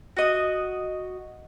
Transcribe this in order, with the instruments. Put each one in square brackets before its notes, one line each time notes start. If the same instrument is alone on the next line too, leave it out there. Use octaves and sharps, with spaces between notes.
[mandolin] F#4 D#5